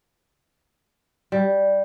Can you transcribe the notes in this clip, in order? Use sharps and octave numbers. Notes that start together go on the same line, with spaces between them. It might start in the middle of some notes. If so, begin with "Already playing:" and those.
G3